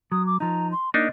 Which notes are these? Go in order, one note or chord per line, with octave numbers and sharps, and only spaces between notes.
F#3 D#6
D6
F3 D#4 A#5
C6
A#3 D4 D#4 D#5